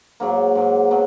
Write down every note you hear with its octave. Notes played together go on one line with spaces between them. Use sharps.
G#2 F#3 A#3
G#2 F#3
B2 F#3